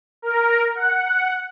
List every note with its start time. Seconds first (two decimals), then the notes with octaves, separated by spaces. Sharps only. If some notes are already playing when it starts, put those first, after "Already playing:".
0.22 A#4
0.75 F#5